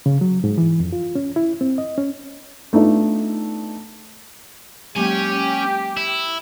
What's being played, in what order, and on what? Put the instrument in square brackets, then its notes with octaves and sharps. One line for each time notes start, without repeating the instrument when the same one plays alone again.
[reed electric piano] C#3
F#3
G#2
E3
F2
F4
C#4
E4
C4
D#5
C#4
[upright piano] A3 B3 D4 D#4 F4
[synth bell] F#3 G#3 A#3 [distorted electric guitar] C#4 G#5 [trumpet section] G4
[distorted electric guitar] E4